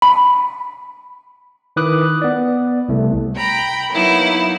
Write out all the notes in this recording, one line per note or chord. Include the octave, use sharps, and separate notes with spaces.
B5
D#3 E4 B4 D6 D#6 F#6
B3 D5
C2 A3
G5 A#5 B5
F#3 A#3 B3 D#4 E4